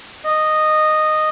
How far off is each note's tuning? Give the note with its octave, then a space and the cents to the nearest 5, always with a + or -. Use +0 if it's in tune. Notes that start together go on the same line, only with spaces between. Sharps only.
D#5 -10